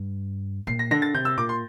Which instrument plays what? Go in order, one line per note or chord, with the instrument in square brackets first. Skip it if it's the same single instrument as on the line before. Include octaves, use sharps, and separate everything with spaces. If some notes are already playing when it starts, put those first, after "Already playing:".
Already playing: [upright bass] G2
[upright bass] A#2 [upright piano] C7
[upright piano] A#6
[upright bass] D3 [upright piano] A#6
[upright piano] A6
[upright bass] C3 [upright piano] G6
[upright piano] E6
[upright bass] A#2 [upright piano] D6
[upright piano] C6